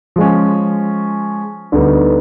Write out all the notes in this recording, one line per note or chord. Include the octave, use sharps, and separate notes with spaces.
F3 G#3 C#4
D2 D3 G3 B3 D#4